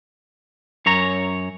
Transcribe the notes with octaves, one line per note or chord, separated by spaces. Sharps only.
F#2 C#5 A#5